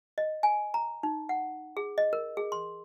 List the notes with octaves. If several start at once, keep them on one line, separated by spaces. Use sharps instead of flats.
D#5
G#5
A#5
D#4
F#5
G#4
D#5
A#4
G#4
C6